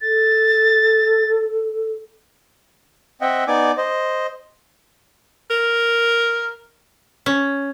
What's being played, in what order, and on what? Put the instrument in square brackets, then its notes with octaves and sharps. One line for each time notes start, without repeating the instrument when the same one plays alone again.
[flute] A4 [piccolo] A6
[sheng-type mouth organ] C4 D#5 E5 F#5 G5
B3 D#4 D5 G#5 D6
C5 D#5
[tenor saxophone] A#4
[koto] C#4